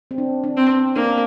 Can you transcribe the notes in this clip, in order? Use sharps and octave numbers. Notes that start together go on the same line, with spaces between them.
C4
D4
D4
C4
C4
A#3 D4